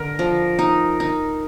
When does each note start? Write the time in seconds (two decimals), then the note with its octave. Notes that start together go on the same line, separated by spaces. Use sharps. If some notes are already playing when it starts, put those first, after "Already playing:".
Already playing: D3 A#4
0.19 F3
0.59 D#4
1.00 D#4